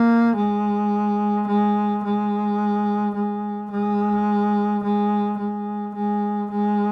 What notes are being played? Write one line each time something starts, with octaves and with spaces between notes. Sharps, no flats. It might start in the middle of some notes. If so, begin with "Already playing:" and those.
Already playing: A#3
G#3
G#3
G#3
G#3
G#3
G#3
G#3
G#3
G#3